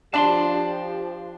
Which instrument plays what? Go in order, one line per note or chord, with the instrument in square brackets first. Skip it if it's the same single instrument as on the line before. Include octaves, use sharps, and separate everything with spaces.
[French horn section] F3 G4 [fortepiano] D4 [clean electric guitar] A5 B5 C6